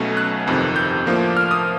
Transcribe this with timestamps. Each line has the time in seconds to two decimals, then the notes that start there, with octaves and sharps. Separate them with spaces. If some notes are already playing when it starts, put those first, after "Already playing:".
Already playing: B1 B2 F#3 A3 C#4
0.17 F#6
0.46 G1 F2 C3 D#3
0.76 G6
1.06 A2 F3 A#3 D4
1.37 F6
1.51 D#6